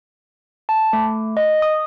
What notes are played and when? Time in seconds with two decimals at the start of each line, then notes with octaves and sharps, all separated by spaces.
0.69 A5
0.93 A3
1.37 D#5
1.62 D#6